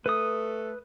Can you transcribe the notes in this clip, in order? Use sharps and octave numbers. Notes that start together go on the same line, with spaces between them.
A3 B4 D#6